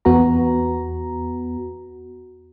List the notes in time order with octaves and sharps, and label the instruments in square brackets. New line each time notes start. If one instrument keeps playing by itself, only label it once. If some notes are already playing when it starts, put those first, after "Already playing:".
[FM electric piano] E2 B3 F#4 A#5